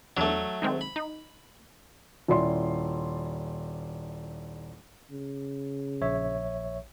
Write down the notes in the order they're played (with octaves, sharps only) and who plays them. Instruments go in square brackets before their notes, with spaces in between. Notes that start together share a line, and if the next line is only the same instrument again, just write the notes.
[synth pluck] E2 D4 [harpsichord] F#3 A3
[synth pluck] D#3 G#3 C4
[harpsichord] B5
[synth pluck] D#4
[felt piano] D#1 E4 D5 C6
[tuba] C#3
[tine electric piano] A#1 C#5 E5